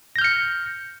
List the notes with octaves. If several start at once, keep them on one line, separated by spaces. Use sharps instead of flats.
F6 G6 A#6 C#7